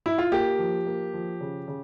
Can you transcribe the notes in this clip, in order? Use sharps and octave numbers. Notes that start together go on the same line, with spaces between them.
E4
F4
A#3 G4
F3
A#3
F3
C#3
C#3